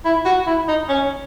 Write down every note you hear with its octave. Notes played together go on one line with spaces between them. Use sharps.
E4
F#4
E4
D#4
C#4